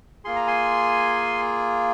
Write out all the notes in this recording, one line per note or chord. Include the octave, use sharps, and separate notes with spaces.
A#3 F4 G#4 C6
A#5
G#5 C6